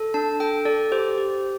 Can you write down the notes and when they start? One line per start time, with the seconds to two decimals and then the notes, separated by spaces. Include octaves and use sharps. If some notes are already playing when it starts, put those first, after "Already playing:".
Already playing: A4
0.14 D4 A5
0.40 A4 G5
0.65 A4 D5
0.92 G4 C5
1.18 G4